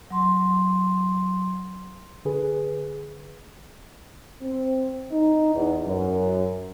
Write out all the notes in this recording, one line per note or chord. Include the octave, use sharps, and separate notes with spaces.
F#3 C6
D3 G#4 B4
C4
D#4
E2
F#2